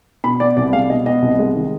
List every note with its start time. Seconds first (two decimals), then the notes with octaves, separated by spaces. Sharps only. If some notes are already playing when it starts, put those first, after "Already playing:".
0.24 B2 B5
0.40 B3 D5
0.57 C2 D5
0.73 G#3 F5
0.90 B2 D#5
1.06 B3 D#5
1.22 C2
1.39 G#3
1.55 D#3